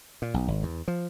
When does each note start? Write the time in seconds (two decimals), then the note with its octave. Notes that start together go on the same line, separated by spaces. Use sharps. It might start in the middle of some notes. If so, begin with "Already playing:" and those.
0.22 A#2
0.34 B1
0.48 G#1
0.63 E2
0.88 F3